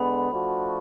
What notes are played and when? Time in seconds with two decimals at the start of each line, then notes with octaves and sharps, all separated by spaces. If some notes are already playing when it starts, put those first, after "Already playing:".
Already playing: D3 G#3 B3 B5
0.31 F3 A3 D4 F#4